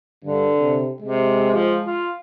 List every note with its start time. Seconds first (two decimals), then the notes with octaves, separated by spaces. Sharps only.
0.25 G2 D3
0.57 C3
1.02 C3 G#3
1.54 F3
1.85 F4